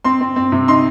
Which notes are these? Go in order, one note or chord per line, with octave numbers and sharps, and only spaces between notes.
C4 C6
C4
C4
C3
D#4 C6